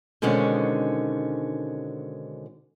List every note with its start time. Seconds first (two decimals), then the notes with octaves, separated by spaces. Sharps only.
0.22 B2 D3 D#3 G#3 C4 C#4